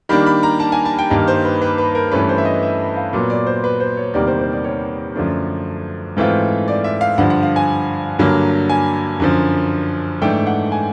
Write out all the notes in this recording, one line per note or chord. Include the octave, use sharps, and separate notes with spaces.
D#3 G3 A#3 D4 B5
B5
A#5
A5
G#5
A5
G5
G2 D#3 G3 A#3 D#4
C5
B4
B4
B4
A#4
G2 E3 A3 C#4 B4
C5
E5
D#5
E5
F5
A#2 F#3 B3
D5
C5
B4
C5
C#5
E2 C3 D#3 G3 A#3 D5
C5
C5
D5
C#5
F#2 D3 F3 A3 D4
G#2 E3 A3 C4 F4
D5
E5
F5
G2 D3 F3 F#5
F#5
F5
G#5
G2 D3 F#3 A#3
G#5
F#2 D3 F3
G#2 E3 A3 D4 G5
F#5
G#5